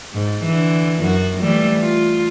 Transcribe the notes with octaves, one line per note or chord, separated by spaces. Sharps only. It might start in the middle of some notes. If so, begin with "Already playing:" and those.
G#2
D3 E3
F#2 F#4
E3 G3 A3
F4